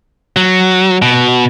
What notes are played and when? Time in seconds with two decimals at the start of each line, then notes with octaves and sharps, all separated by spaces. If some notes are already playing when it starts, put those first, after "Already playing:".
0.37 F#3
1.02 B2